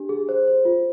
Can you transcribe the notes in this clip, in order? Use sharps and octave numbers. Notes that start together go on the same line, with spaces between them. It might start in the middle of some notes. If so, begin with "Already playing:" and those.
Already playing: D4 G4
G#4
C5
C5
F4